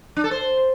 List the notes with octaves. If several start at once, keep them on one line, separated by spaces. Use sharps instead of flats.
D4
A4
C5